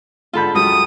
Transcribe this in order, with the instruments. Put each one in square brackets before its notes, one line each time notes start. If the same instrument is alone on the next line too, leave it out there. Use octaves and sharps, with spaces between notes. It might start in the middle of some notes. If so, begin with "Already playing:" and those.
[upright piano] G#2 D3 G6 [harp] F4 A4 B5
[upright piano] C#2 F#3 [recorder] D#6